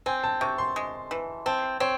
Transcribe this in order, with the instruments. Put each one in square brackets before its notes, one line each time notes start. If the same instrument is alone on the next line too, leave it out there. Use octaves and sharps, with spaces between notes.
[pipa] C4 [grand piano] G#5
[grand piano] A5
[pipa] C3 [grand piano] C#6
[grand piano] C6
[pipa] G#3
E3
[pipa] C4 [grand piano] A5
[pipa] C4 [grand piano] C#5